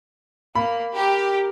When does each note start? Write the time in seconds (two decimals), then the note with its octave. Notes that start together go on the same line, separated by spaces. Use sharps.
0.55 A#3 B5
0.95 G4 A#4